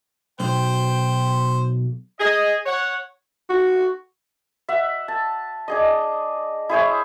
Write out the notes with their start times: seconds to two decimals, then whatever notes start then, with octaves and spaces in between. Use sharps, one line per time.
0.40 B1 C5 G5
2.20 G#4 D#5
2.66 C#5 F#5
3.50 F#4
4.69 E5 F#5
5.08 A5
5.68 D4 G#4 D#5
6.69 E4 G#4 C5 C#5